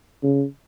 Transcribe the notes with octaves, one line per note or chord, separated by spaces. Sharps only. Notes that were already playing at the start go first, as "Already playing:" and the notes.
C#3